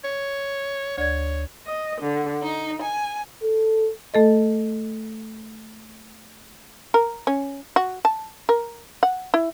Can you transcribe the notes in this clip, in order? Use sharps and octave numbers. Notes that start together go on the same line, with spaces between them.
C#5
D2 C#5 D5 G#6
D#5
D3
D#4
G#5
A4
A3 A4 D#5
A#4
C#4
F#4
A5
A#4
F#5
E4